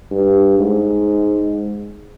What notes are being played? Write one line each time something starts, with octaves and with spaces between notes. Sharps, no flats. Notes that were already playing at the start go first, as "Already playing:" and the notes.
G2
G#2